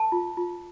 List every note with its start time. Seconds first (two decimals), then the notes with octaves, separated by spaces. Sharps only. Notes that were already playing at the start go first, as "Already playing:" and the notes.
Already playing: A#4 A5
0.12 F4
0.37 F4